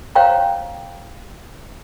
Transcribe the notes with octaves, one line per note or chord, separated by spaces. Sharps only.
C5 C#5 F5 G5 A#5